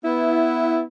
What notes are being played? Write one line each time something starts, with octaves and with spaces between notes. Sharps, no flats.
B3 E4